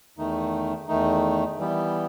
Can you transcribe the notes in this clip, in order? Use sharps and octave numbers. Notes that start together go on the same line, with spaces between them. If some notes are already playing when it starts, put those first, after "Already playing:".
E2 D#3 A3 D#4
E2 D#3 A3 D#4
E3 G3 B3